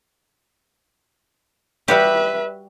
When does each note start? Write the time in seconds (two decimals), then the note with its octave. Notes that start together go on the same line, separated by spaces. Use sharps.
1.88 G3 F#4 G4 B4 E5